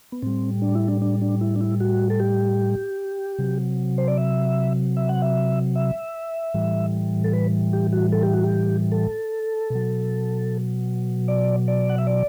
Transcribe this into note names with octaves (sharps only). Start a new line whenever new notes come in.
B3
A2 G3 C4
D4
E4
D4
D4
D4
E4
D4
E4
F#4
A4
G4
C3 F#3
C5
D5
E5
E5
F#5
E5
E5
A2 E3 G3
A4
B4
G4
F#4
A4
G4
F#4
G4
A4
B2 F#3
D5
D5
F#5
E5
D5